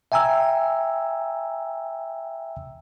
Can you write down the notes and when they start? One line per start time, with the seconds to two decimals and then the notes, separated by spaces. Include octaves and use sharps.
0.12 E5 G5 G#5 A#5 E6